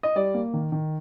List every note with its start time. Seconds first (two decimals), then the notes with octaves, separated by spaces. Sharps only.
0.03 D#5
0.16 G3 D5
0.34 A#3
0.53 D#3
0.72 D#3